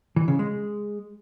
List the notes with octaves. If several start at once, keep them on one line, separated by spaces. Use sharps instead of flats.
E3
C#3
G#3